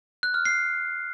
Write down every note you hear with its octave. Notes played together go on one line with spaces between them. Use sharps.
F#6
F6
C7